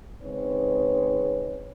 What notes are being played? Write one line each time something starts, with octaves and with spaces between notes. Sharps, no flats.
C#3 G#3 C4 D#4 B4 C#5